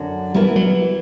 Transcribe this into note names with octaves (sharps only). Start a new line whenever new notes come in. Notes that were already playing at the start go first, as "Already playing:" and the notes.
Already playing: F#2 D3 F#3
E3 G3 B3 E4 A#4
F#3